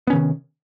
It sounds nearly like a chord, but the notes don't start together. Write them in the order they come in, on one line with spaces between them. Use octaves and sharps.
B3 C#4 D#3 C3